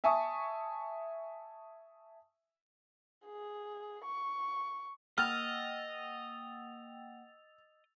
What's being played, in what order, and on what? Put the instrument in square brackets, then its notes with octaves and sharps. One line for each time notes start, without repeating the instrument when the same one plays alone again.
[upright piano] E5 G#5 A5 C#6 D#6
[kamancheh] G#4
C#6
[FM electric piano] A#3 F#5 G5 [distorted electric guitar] D#5 [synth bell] E6 A6 F7 [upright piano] F6